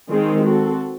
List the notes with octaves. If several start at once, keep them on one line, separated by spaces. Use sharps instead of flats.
D#3 G#3 C4 D#4 G#4
C4 F#4 A4